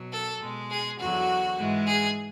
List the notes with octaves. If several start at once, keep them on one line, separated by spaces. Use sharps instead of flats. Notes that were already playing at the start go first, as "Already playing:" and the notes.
Already playing: B2 F#3
A4
B2 G#3
G#4
E2 D3 F#3 F#4
G#2 E3 G#3
G#4